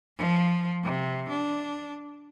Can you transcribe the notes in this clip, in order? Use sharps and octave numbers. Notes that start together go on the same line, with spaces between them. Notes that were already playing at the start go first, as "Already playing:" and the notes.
F3
C3
D4